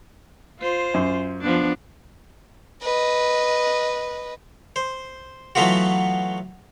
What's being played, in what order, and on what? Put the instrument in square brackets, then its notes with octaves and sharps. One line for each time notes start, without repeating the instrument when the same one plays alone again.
[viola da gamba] F4 C5
[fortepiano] F#2
[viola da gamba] F3 B3 D4
[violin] B4 D#5
[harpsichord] C5
E3 F#3 A3 B3 F4 F#4